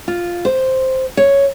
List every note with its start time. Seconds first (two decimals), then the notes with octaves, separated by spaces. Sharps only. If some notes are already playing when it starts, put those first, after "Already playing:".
0.08 F4
0.45 C5
1.17 C#5